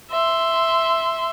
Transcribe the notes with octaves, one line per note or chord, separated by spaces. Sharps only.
E5 C6